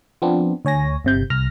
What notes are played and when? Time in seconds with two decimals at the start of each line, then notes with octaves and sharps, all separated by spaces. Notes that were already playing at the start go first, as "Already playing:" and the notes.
0.22 F3 B3 C4 D4
0.65 D2 C#5 G#5 A#6
1.05 G1 C3 G6
1.30 C2 F6 A#6